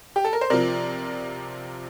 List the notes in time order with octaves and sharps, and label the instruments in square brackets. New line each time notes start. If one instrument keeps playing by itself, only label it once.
[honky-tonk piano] G4
A4
A#4
C5
C3 F3 A#4 D5